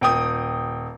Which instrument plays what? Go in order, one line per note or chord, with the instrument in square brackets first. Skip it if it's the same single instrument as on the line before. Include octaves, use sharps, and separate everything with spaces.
[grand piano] D#1 G5 D#6